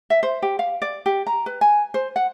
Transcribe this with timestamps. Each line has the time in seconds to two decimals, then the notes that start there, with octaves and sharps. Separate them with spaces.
0.10 E5
0.23 C5
0.42 G4
0.59 F5
0.82 D5
1.06 G4
1.27 A#5
1.46 B4
1.61 G#5
1.94 C5
2.16 F#5